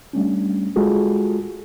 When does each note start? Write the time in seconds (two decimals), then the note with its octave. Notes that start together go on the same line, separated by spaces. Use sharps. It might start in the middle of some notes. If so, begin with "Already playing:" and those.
0.13 G3 A3 C#4 D4
0.76 G#3 F4 F#4 G#4 A4